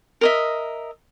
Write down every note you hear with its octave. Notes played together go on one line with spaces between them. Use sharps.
A#4 D#5 E5